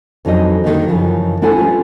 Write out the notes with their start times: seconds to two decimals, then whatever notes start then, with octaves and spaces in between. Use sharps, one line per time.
0.25 F2 E3 F#3 C#4 D#4 D#5
0.64 D3 D#3 F3 G3 A#3 D#4
0.88 F#2 C#3 E3 F3
1.42 C4 D4 E4 A4 F#5 G#5
1.57 E3 G3 C#4 F4